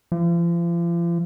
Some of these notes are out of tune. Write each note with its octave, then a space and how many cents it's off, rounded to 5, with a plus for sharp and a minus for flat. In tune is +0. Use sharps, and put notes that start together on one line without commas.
F3 -40